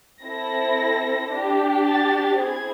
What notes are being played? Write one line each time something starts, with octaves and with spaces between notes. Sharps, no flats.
C4 E4 A4 A#6
D4 G4
A6
C4 E4 G#4 G#6